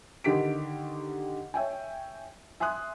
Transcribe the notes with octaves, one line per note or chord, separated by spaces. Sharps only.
D3 D#3 G4 B6 D7
C#5 E5 G5 G#5
E5 G#5 C6 D#6 F#6